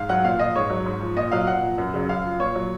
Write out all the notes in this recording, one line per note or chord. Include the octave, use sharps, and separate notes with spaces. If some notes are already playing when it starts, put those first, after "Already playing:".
Already playing: G#2 F5
F#3 F#5
A#2 F5
F3 D#5
G#2 C#5
F#3
G#2
F3
A#2 D#5
F#3 F5
A#2 F#5
F3
F#2
C#3 F#3
F#2 F5
F3
A#2 C#5
F#3